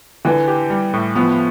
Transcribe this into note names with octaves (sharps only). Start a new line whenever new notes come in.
D3 E3
G4
G3
A2
F3 B3